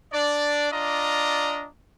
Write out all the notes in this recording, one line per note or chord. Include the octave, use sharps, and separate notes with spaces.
D4 D5
D4 F4 D5 D#5 A#5